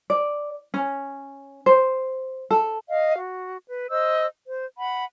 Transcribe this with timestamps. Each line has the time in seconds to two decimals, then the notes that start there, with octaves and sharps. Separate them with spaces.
0.10 D5
0.74 C#4
1.66 C5
2.50 A4
2.87 D#5 F5
3.17 F#4
3.67 B4
3.89 C5 D#5 E6
4.46 C5
4.77 F#5 B5